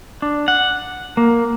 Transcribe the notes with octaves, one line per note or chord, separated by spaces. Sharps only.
D4
F#5
A#3